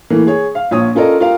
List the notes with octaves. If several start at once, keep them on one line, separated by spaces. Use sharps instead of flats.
E3 A3 A#3
G#4 C#5
F5
A#1 F4 C#5 D#6
C#4 F4 A4 A#4 D5 D#5
F4 G4 A#4 F5